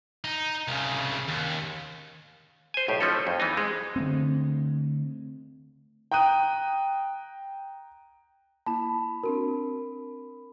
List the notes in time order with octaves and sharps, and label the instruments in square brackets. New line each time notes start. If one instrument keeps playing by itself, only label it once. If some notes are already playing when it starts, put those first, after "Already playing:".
[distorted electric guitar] D#4
C2 C#3
D#2
[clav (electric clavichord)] C5 G#5
B1 A2 G4
F3 A3 C#4 D#4 A4
F2
E3 B3 D#4
G#3
[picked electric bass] D3 A3 C4
[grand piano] G5 A#5 D#6 F#6 D#7
[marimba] A#3 E4 [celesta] A5 [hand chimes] B5
[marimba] C4 D4 F#4 [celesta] A#4